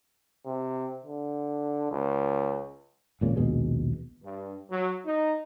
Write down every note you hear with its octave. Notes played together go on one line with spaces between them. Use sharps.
C3
D3
C#2
G#1 A#2 C#3
A#1 D#2 B2 G#3
G2
F#3
D#4